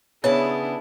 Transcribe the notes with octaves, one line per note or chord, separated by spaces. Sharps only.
C#3 B3 D4 E4 G#4 C#5 A5